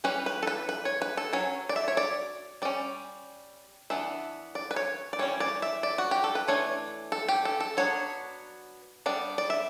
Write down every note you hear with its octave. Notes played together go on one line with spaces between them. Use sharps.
E3 G3 C#4 B4
B4
A4
B4
B4
C#5
B4
A4
F#3 C#4 C#5
D5
E5
C#5
D5
G3 C#4 D5
E3 B3 D4 E5
D5
B4
C#5
D5
E3 G3 C#4 C#5
D5
E5
D5
F#4
G4
A4
B4
E3 A3 D4 C#5
A4
G4
A4
A4
F#3 B3 D4 C#5
G3 B3 D4 D5
D5
E5